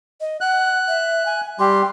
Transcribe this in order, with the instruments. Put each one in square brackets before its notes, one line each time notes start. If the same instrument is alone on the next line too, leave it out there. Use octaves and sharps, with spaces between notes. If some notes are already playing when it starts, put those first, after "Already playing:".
[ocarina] D#5
[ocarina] F#5 [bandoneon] F#6
[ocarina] E5
G#5
[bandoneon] G3 G4 [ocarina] C6